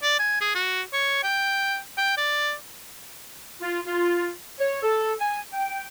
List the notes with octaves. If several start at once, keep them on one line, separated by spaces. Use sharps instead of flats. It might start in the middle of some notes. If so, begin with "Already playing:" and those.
D5
G#5
G#4
F#4
C#5
G5
G5
D5
F4
F4
C#5
A4
G#5
G5